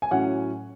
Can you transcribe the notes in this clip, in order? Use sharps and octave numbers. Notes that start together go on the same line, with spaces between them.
G#5
A2 F#3 C#4 F#5